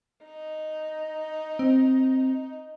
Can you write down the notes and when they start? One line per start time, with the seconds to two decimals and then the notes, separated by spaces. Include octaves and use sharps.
0.25 D#4
1.59 C4